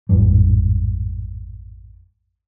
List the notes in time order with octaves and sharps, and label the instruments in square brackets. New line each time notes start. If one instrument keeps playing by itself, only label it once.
[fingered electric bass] A1 F2 G#2 G3